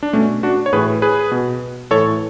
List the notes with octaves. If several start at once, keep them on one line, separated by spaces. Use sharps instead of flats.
D4
B2 A3 C#4
D4 F#4
C#5
A2 E3 G#4 B4
G#4 B4
B2
A2 E3 A4 C#5